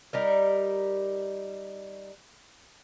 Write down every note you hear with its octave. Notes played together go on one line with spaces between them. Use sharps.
G3 D#4 A#4